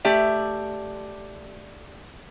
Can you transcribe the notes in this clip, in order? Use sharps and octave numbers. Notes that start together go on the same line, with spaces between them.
A3 G4 D5 E5